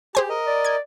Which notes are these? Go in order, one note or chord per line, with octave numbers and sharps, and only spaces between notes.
G4 G#4 C5 G#5
A#4 D#5
D5
G#6